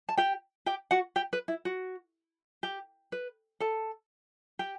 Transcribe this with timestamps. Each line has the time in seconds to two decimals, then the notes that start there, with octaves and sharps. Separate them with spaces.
0.09 A5
0.17 G4 G5
0.66 G4 G5
0.91 F#4 F#5
1.16 G4 G5
1.33 B4
1.48 E4
1.65 F#4
2.63 G4
3.12 B4
3.60 A4 A5
4.59 G4 G5